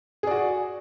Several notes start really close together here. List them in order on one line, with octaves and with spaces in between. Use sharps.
G#4 D5 F#4